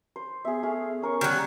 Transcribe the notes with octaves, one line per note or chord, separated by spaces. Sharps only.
C5
B3 G#4 E5
A3 G#4 F5
C#4 A#4 C#6
D#3 F#3 G3